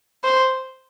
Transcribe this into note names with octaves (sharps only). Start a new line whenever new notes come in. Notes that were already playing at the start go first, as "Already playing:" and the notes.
C5